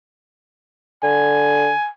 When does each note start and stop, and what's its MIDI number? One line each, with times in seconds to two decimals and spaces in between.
1.03 1.70 50
1.03 1.92 80